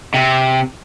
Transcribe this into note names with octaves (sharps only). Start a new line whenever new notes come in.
C3